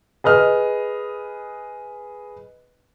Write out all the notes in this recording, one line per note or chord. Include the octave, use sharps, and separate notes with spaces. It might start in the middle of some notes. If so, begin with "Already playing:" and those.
G#4 B4 D#5 F6